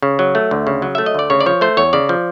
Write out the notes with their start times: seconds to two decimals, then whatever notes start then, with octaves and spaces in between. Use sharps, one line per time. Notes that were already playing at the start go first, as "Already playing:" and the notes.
0.03 C#3
0.19 F#3
0.35 A3
0.51 D2
0.67 C#3
0.82 F#3
0.95 A3 E5
1.06 D#5
1.14 D2 D5
1.30 C#3 C#5
1.40 D5
1.46 F3 C#5
1.61 A3 C5
1.77 E2 C#5
1.93 C#3 D5
2.09 F3